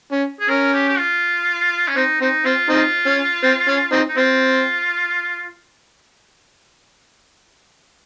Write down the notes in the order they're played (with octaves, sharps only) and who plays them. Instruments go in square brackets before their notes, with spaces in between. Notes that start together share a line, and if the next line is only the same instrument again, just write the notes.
[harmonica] C#4
[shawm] G#4
[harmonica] C#4 [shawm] A#4
[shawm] G4
G4
F4
C#4
[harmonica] C4 [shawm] D#4
[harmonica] C4 [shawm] D#4
[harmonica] C4 [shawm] F4
[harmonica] C4 D#4 [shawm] F4
[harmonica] C#4
C4
C#4
C4 D#4
[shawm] D#4
[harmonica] C4 [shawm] F4